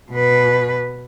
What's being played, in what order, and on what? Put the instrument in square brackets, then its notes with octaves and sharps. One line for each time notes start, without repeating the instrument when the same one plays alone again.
[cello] B2 B4